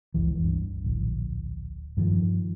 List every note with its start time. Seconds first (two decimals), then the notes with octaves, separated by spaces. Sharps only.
0.14 F#1 C#2 E3
0.44 G2
0.84 D1 A#1
1.97 G2 D#3 F3